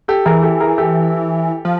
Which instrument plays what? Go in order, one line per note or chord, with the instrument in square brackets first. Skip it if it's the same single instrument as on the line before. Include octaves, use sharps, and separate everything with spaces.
[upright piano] G4 A4
[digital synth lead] E3 [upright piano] G#4 A#4
[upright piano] G4 A4
G#4 A#4
G4 A4
[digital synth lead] F3